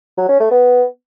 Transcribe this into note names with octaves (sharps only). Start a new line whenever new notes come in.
F#3
C#4
A3
B3